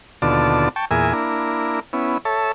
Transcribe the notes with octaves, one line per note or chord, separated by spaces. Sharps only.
D#2 B2 D3 F4 D5 A5
G5 A5 C#6
E2 A#2 G#4 A#4 E5 G#5
A#3 D4 E4 A#4
B3 C#4 E4
A4 C#5 E5 A5